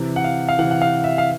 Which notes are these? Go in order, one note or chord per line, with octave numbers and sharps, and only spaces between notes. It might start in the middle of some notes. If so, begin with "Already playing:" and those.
Already playing: C3 E3
F#5
F5
F5
C3 E3 F#5
F#5
F5
E5
F5